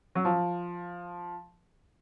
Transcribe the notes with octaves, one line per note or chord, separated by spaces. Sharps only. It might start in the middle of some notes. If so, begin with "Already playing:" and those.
F#3
F3